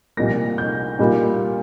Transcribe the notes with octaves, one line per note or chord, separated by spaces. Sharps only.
C2 A#2 F3 A#3 A#6
G6
A#2 G3 A#3 F4